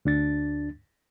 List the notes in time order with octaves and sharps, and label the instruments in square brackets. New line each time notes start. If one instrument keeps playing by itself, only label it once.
[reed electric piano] D2 D4 A6